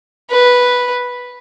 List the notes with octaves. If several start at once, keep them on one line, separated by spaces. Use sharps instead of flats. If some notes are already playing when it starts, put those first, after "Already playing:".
B4